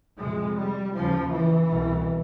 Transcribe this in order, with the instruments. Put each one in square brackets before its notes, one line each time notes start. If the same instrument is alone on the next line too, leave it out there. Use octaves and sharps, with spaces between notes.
[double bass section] F2 C3 G#3
G3
D#2 C#3 F3
E3
C2 B2